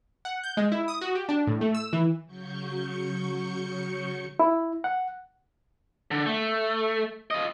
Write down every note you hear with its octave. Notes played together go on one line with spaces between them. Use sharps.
F#5
G6
G#3
E4
D#6
F#4
G4
D4
A2
A3
E6
E3
C#3 F#3 C#6 G6 C#7
E4
F#5
D3
A3
F4 D#5